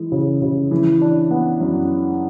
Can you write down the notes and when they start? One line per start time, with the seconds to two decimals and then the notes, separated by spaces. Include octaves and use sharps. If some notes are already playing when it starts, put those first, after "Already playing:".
Already playing: E3 G#3
0.12 C#3
0.42 C#3
0.71 E3
1.01 D4
1.31 B3
1.60 F#2